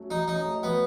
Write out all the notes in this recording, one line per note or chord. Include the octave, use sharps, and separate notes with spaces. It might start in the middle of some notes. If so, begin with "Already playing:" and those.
Already playing: F#3 A3 C#4
D#4 F#4
C#4 D#4
A3
F#3 B3